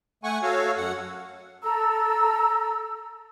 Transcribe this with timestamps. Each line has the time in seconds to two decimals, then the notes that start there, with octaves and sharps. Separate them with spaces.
0.23 A3 F#5 G#5 C#6
0.42 F#4 A4 C#5 F5
0.76 F#2 F#5
1.63 A4 A#5 E6